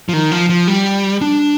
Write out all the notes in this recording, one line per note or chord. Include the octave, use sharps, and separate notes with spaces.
F3
D#3
F3
F3
G3
D4